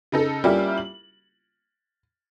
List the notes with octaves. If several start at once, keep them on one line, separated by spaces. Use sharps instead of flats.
C#3 D#4 A4
G3 A#3 C#4 E4 F4 G4
F#7